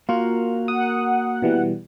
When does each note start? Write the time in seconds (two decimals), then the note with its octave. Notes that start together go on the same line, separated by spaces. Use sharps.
0.09 A#3 F4 F#4 A#4
0.68 F#5 D#6
1.42 B2 E3 G3